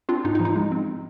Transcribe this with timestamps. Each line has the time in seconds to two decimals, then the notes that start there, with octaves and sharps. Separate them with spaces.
0.09 C4 D4 F4
0.24 G#2 D#4
0.35 D#4
0.40 F3
0.45 D#4
0.56 G#3
0.72 C4